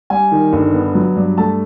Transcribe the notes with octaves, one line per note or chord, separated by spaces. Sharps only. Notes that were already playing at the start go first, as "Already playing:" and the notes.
G3 G#5
D#3
G1
B3
F#3
G2
A3 A5